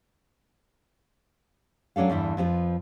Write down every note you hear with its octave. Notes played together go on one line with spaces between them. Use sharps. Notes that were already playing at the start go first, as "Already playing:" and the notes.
F#3 C#4 D4 A4 F5
E2 G2 D3 E3
F2 F3 A4 B4